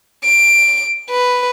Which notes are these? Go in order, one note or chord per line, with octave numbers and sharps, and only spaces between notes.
D7
B4